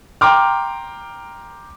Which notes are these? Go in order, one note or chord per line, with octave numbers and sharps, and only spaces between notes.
G5 A#5 C6 D6 F6